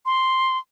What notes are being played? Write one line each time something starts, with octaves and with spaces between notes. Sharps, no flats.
C6